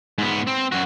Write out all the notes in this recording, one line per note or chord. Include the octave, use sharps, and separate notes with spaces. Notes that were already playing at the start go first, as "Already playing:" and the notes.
G#2 B3
C4
F#2 F#4